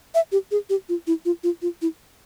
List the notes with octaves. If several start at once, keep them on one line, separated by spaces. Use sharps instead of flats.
E5
G4
G#4
G4
F4
E4
F4
F4
F4
E4